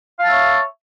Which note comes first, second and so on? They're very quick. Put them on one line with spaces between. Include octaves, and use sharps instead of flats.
F5 A5 E5 C#5